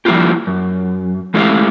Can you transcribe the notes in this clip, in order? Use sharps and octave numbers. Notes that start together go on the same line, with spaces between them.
F3 G3 A#3 E4 F4 G4
F#2
G#3 A3 E4 G4 D#5 F5